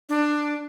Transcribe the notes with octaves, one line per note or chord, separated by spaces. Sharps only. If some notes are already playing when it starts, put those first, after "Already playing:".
D4